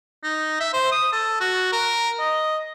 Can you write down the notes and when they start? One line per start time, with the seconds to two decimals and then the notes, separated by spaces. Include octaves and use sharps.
0.24 D#4
0.60 E5
0.74 C5
0.92 D#6
1.13 A4
1.40 F#4
1.73 A#4
2.20 D#5